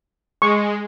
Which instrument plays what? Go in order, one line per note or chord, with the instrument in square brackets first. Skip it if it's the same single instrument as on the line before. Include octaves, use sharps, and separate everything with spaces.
[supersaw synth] G#3 [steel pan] C#6